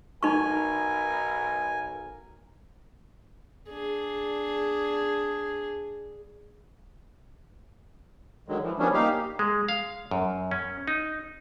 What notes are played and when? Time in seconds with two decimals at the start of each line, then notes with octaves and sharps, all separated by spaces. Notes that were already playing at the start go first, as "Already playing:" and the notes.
0.23 B1 D#4 A#4 G#5 C#6
3.69 D4 G#4
8.48 D3 D#3 F#3 G#3
8.63 E3 F3
8.79 D#3 F3 G3 B3 C#4 D4
8.94 A#3 D#4 G4 F5
9.39 G#3
9.69 F5
10.11 F#2
10.51 C#4
10.88 D#4